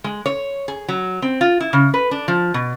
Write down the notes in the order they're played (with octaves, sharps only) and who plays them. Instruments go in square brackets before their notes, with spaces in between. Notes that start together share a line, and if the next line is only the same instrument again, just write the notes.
[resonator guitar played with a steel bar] G#3
C#5
G#4
F#3
C4
F4
E4
C#3
B4
D4
F3
B2